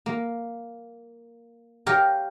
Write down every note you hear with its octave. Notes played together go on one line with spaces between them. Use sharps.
A#3
G4 A#4 C#5 F5